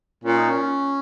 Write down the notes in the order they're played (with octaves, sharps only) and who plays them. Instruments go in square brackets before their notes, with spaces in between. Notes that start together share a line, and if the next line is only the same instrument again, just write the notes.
[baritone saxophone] A#2 [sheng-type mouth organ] C#4
[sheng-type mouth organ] D#4
C#4